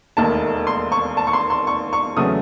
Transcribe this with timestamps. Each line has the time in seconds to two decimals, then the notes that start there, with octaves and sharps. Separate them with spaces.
0.17 E1 D#2 D#3 A3 A5
0.67 C6
0.92 C#6
1.17 A5
1.27 C#6
1.33 C6
1.50 C6
1.67 C#6
1.93 C#6
2.17 E2 C#3 F#3 A3 D#6